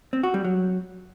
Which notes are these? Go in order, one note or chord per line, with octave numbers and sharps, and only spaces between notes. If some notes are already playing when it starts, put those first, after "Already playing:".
C4
F#4
G3
F#3